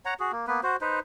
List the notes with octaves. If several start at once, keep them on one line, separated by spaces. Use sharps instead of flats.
C#5 F#5 A#5
F#4 G#4
A#3
A#3 B3 B4
F#4 C5
D#4 B4 C5